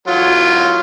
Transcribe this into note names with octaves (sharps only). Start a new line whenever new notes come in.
F#3 F4